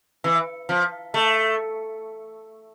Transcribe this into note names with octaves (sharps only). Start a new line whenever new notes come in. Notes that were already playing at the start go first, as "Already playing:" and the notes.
E3
F3
A3